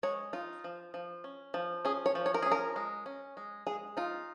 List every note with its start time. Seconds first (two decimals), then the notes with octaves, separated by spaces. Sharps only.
0.03 G#3 C#5
0.33 D#4 F4
0.64 F3
0.94 F3
1.24 C#4
1.54 F3
1.85 C#4 G#4
2.06 C#5
2.15 F3
2.26 C#5
2.34 A#4
2.42 C#4 G#4
2.52 A#4
2.76 G#3
3.06 C#4
3.37 G#3
3.67 G#3 G#4
3.97 D#4 F4